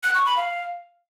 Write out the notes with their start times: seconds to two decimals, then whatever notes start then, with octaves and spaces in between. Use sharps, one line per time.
0.04 F#6
0.15 C#6
0.26 B5
0.37 F5